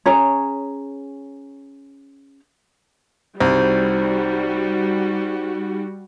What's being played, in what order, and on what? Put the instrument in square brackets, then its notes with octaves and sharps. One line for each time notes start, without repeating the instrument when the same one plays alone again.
[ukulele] C#4 G#4 C#5 A#5
[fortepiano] C2 [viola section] G3 F#4 [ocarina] D#4 [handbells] C5